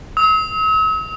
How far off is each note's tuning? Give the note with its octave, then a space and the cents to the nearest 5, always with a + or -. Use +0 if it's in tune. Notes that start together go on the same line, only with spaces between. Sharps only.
E6 -45